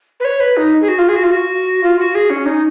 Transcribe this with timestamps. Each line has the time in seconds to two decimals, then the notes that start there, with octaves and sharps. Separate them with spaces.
0.20 B4
0.25 C#5
0.40 B4
0.57 D#4
0.81 G#4
0.88 F#4
0.99 F4
1.09 G#4
1.16 F#4
1.24 F4
1.31 F#4
1.83 F4
1.99 F#4
2.15 G#4
2.30 C#4
2.46 D#4